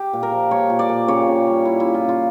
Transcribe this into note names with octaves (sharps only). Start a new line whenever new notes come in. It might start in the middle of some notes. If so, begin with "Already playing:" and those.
Already playing: G4
A#2
A#4
F3
A#3 C#5
A#2
D5
A#2
C#3 C#5
C#3
G3
A#3 E4
E4
C#3
F4
C#3 F4